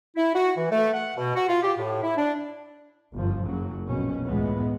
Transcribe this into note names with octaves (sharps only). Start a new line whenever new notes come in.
E4
F#4
E3
A3
F#5
B2
F#4
F4
G4
A2
E4
D4
G1 F#2 F3
F#1 C#3 F#3
F1 A#1 F#2 B2 C#4
C#2 A2 E3 G#3 B3